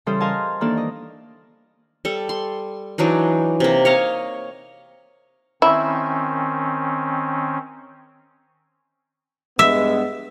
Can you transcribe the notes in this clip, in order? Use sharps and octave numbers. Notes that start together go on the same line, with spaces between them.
C#3 E3 G3 A4 C5 D#6
A#4 C5 D#5 F5 G#5 A5
D#3 E3 A#3 D4 A4 D5
D#5
G3 A4
C6
E3 F#3 D4 D#4
C3 A#3
C#5 D#5 F5
D#3 C4 C#4 E4
G2 G#3 B3 E5